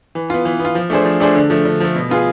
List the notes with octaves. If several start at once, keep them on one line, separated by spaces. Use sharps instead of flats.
E3
B3 F4
E3
B3
F4
F3
A3 D4 G#4 C5
F3
A3 D4 G#4 C5
D3
F3 A3
D3
F3 A3
B2
B3 F4 G#4